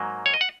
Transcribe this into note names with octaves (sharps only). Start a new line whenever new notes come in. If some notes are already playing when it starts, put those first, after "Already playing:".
Already playing: G#2 F#3 A#3
C#5
D#5
F#5